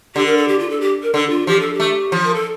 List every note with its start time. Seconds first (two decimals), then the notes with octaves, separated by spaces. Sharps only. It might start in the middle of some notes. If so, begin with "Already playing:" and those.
0.15 D3 G4
0.26 A#4
0.37 A4
0.48 G4
0.59 F4
0.70 A4
0.81 G4
1.03 A#4
1.14 D3 A4
1.30 F4
1.47 F3 G4
1.60 A4
1.74 G4
1.80 A3
2.12 F3
2.24 A#4
2.34 A4